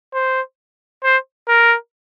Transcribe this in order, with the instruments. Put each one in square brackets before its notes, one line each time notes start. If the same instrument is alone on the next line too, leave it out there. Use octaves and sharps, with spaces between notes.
[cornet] C5
C5
A#4